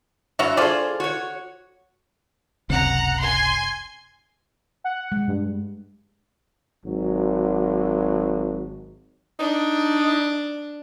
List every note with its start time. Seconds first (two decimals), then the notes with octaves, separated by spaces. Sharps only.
0.39 G2 F#4 C#5 E5
0.57 F4 G#4 A4 C5 D5
1.00 F#4 C#5
2.70 F#1 C#2 C3 F#5 A#5
3.20 G#5 C6
4.84 F#5
5.12 G#3
5.27 G2
6.84 G#1 F#3
9.39 D4 D#4